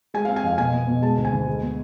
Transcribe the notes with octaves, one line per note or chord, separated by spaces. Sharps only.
G#3 G#5
F5
C4
G#5
F2 F5
B2 G#5
B3
B2
G#3 A5
D2
G#5
D2
G#3
B3